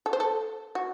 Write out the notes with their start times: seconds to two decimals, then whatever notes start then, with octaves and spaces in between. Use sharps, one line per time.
0.06 A4
0.13 C5
0.20 A4
0.75 F#4